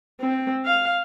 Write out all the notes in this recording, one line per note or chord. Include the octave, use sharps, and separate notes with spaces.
C4
F5